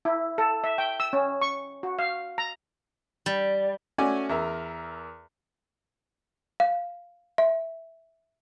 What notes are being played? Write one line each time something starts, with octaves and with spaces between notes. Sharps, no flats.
E4
A4
E5
G5
E6
C#4
C#6
F#4
F5
A#5
G3
A3 C#4 F#4 D5 G#5
E2 A#4 E5
F5
E5